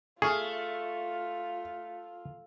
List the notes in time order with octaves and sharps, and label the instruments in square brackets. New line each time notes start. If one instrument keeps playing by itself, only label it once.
[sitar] A3 [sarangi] F4 [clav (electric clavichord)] G#4 [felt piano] C#6 F6